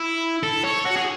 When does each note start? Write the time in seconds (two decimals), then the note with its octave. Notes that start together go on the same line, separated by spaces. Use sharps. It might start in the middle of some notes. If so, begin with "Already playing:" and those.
Already playing: E4
0.43 A4
0.64 C#5
0.85 F#4
0.96 G#4